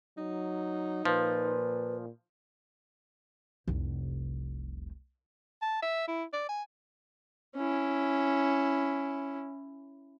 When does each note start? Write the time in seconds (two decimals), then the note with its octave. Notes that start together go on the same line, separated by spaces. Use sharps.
0.18 F#3 D#4
1.05 A#2 F3 B4
3.68 F1 C2
5.62 A5
5.82 E5
6.08 E4
6.33 D5
6.49 G#5
7.55 C#4 E4